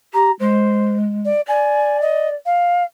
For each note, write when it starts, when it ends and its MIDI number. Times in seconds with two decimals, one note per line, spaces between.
0.13 0.31 67
0.13 0.31 82
0.39 1.30 56
0.39 0.97 72
1.25 1.41 74
1.48 2.35 74
1.48 1.99 80
2.01 2.28 75
2.45 2.83 77